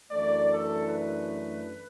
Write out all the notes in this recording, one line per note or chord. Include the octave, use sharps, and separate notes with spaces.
F#2 E3 A3 D4 D5
A4
B4